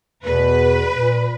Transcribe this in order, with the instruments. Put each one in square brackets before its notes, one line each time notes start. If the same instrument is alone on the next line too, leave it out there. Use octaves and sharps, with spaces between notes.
[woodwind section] E2 B2 [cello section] B4
[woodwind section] A#2